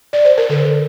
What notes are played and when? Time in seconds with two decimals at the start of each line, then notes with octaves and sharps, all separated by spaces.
0.13 D5
0.25 C5
0.38 A#4
0.49 D3 A4